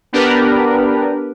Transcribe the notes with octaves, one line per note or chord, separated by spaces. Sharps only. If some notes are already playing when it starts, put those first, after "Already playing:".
B3 D4 G4 A#4 B4